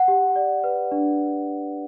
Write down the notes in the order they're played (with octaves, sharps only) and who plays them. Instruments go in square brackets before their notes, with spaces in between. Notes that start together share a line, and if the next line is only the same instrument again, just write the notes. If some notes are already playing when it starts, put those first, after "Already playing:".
Already playing: [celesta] F#5
G4
D5
B4
D4